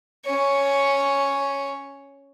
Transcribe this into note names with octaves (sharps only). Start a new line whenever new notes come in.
C#4 C#5